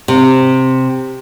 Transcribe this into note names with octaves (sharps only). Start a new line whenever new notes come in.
C3